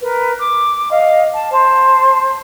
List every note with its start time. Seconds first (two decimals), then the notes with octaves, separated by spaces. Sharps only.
0.01 A#4 B4
0.39 D6
0.90 D#5 F5
1.34 A5
1.51 C5 A5